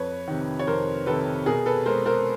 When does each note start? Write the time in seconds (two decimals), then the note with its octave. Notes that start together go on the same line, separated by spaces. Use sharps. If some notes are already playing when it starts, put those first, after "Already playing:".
Already playing: F2 B4 C#5
0.28 C3 D#3
0.60 C#5
0.67 F2 A#4 C5
1.06 C3 D#3 A4 B4
1.46 B2 G#4 A#4
1.66 A4 B4
1.86 G#3 A#4 C5
2.06 A#4 C5